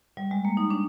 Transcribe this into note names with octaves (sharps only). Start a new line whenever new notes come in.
G3
G#3
A#3
D#4
D4